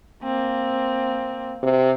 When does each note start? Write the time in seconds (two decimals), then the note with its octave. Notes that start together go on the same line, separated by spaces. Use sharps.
0.23 A#3 C4
1.63 C3